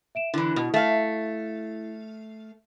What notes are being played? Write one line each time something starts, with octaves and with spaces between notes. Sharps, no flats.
E5 D7 E7
D3 E3 E4
B2
A3 F5